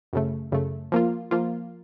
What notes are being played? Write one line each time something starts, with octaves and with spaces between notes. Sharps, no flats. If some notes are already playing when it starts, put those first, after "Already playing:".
F#2 C#3 A3
F#2 C#3 A3
F3 A#3 F4
F3 A#3 F4